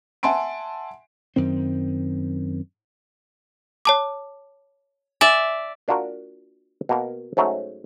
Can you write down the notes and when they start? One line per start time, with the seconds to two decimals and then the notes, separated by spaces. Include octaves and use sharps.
0.23 E5 F#5 G#5 A5 C6 D7
1.36 F#2 D#3 C4
3.85 C#5 A5 D6
5.21 D5 E5 G#5
5.88 A#3 D4 F4 F#4 A#4
6.89 B2 A#3 A#4
7.37 G#2 F#3 A3 C#4 F#4 A#5